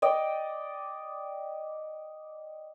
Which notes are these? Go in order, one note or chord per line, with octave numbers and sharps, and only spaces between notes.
D5 D#5 G5